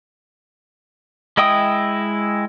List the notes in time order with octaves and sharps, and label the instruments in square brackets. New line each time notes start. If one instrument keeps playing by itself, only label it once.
[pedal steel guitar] G#3 E4 D#5 G5 D#6